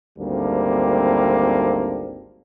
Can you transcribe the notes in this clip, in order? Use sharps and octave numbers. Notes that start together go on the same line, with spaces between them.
G#1 D2 G3 A#3 C4 D4